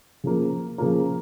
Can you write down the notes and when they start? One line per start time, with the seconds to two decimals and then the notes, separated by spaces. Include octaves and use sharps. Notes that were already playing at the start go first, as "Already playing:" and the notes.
0.24 C#3 F3 A#3
0.78 C#3 F3 A#3